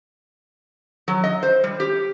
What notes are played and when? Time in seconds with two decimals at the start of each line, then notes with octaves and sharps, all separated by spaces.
1.08 F#3
1.24 D#5
1.43 C5
1.64 G3
1.80 G4